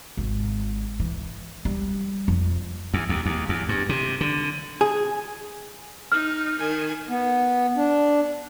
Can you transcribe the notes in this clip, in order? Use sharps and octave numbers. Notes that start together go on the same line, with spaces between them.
G#1
E3
G3
F2
E2
D#2
D#2
E2
G2
C3
D3
G#4
D#4 F6
D#3 G#5
B3
D4